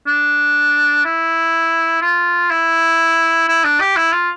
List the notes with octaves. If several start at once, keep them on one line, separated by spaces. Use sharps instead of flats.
D4
E4
F4
E4
E4
D4
G4
E4
F4